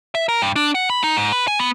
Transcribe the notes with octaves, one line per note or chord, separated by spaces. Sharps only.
E5
A#4
G2
D4
F#5
B5
D#4
G#2
B4
G#5
B3